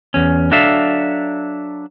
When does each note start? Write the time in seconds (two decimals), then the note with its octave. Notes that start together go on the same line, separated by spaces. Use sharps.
0.14 E2 C#4
0.51 F#3 D4 A4 E5 F5